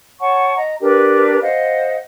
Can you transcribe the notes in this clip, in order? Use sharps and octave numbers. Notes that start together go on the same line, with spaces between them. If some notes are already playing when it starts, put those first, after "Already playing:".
C#5 F#5 A5 C#6
D#5 A#5
D4 G4 A#4 B4
C5 D#5 F5 F#5